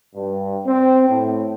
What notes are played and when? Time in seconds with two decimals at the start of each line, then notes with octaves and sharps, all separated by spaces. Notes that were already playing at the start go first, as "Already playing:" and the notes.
0.15 G2
0.66 C4
1.08 A2